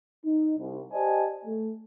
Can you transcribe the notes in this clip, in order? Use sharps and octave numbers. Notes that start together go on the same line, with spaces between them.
D#4
C2
G4 C5 D5 D#5 G#5 A5
A3